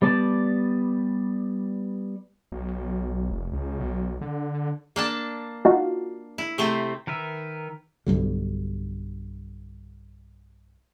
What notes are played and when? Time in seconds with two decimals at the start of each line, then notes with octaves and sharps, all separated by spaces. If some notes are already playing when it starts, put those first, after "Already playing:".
0.02 G3 B3 D5 A5
2.52 B1
3.30 F1
3.52 C#2
3.79 B1
4.21 D3
4.96 A#3 D4 A5
5.65 D#4 F4 F#4
6.38 E4
6.58 C3 A3 C4
7.07 D#3 A#4 B4 E5
8.06 B1 G2 D3